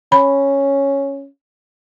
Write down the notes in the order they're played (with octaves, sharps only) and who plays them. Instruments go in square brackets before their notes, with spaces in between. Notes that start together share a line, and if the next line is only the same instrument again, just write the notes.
[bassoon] C#4 [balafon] B5